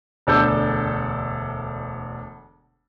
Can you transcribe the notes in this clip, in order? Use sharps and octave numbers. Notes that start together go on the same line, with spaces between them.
E1 D2 D4 A4 E6 G6